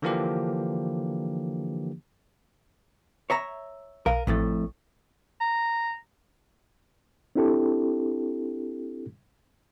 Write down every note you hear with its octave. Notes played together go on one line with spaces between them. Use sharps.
D3 E3 F3 A#3 D4 G4
C#5 E5 A#5
B1 A#4 F5 D#7
A1 F2 A2 A3 A6
A#5
C4 D4 E4 G4 A4